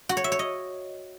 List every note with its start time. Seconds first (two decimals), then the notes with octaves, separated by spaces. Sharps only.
0.09 F#4
0.17 C#5
0.24 E5
0.32 C#5
0.39 D#5